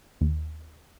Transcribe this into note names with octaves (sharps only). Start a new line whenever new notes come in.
D#2